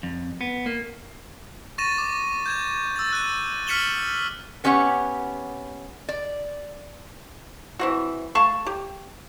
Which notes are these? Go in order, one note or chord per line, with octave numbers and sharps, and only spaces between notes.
F2
B3
A#3
C#6 A6 A#6 D#7 E7
D6
G6 G#6 E7
E6 A6
F#6 D#7
F6 B6 C#7 E7 F#7 G7
B3 C#4 G4 C#5 F#5
D5
E3 C4 F#4
A3 F5 A5 C#6
G4